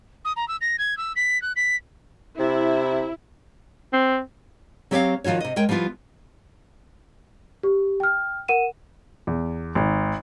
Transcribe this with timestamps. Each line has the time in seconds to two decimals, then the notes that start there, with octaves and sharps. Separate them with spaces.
0.25 D#6
0.36 A#5
0.48 E6
0.61 A#6
0.79 G#6
0.97 E6
1.16 B6
1.42 F#6
1.56 B6
2.39 C3 E4
3.93 C4
4.91 F#3 C4 G4 C#5 E5 F5
5.24 D#3 F3 F4 F#4 C#5
5.40 C3 D#5
5.56 G#3 A#4 C#5 G5
5.69 F3 G3 B3 E4 F4
7.63 G4
8.00 G5 F6
8.48 A#4 F#5 D#7 E7
9.27 E2
9.75 G#1